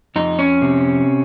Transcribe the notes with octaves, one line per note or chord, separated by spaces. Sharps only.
F2 D#4
C#4
C3